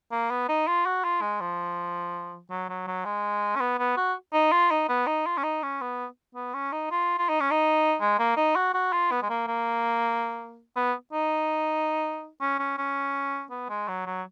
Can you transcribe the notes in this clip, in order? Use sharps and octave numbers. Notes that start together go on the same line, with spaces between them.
A#3
B3
D#4
F4
F#4
F4
G#3
F3
F#3
F#3
F#3
G#3
C#4
B3
B3
F#4
D#4
F4
D#4
B3
D#4
F4
C#4
D#4
C#4
B3
B3
C#4
D#4
F4
F4
D#4
C#4
D#4
G#3
A#3
D#4
F#4
F#4
F4
B3
G#3
A#3
A#3
B3
D#4
C#4
C#4
C#4
B3
G#3
F#3
F#3